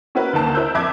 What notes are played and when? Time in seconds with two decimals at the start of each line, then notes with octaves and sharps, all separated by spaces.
0.15 C#4 E4 F#4 A#4 B4
0.33 D2 D#3 A#3 A5
0.54 E4 A#4 C5 E6 G6
0.74 F2 E5 D6 G#6